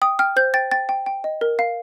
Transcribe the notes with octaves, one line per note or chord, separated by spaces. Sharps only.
G5 D#6
G5 F6
C5 G6
G5 A6
G5 A6
G5
G5
D#5
A#4
F5